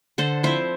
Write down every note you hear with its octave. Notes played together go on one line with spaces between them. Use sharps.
D3 A4 C5
F3 C4 E4 C5 E5